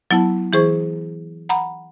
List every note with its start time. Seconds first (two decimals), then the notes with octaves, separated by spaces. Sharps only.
0.11 F#3 B3 E4 A5
0.53 E3 E4 G#4 C5 C#6
1.49 F#5 A#5 B5